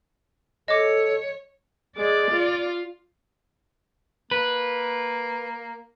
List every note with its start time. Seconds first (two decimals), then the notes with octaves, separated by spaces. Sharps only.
0.68 A4 C#5 D#5 D6
1.97 G#3 D5
2.31 F4
4.31 A#3 B4